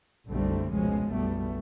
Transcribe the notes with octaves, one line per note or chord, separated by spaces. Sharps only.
F#1 B1 D3 G3 A3 C4
F1 C#2 B2 F3 G#3 C#4
F#1 B1 B2 G3 A3 B3